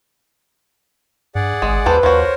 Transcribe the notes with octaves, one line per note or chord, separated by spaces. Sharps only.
G2 G#4 D5 F#5
G#1 G#3
D#2 G3 A4 B4 C5
D#2 F3 F#4 A#4 C5 C#5